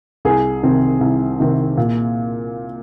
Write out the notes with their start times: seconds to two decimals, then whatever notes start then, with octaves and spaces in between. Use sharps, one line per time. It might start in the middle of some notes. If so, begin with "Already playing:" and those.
0.25 C2 G#4
0.63 C3 D#3 C4
1.01 C2
1.40 C3 D#3 C4
1.77 A#2